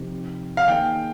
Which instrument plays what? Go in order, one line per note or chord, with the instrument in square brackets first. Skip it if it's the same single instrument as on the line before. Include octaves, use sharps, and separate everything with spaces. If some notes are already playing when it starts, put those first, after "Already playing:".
Already playing: [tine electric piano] C3 F3 C4 D#4 G4
[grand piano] F5
[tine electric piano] D#3 A#3 D#4 G#4 [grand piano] G5